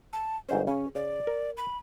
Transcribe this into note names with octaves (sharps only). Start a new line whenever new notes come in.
A5
G1 G#2 C#4 C5
C#3 C#4
C#3 D5
A#4
B5